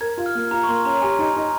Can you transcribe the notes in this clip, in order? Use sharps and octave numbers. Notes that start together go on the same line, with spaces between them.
A#4 G#6
F4
F6
A#3
F4 A#5
C#6
A#3 C6
C#4 A#5
G4 G#5
D#4
D#4